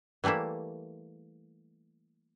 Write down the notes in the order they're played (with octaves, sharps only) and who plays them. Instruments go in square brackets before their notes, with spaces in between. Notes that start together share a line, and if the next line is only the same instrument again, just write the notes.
[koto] E3 G3 A3 A#3 E4